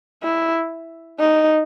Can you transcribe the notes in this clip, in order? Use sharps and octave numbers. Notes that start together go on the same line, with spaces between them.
E4
D#4